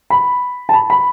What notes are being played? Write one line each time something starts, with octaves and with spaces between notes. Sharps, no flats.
B5
A5
B5
B5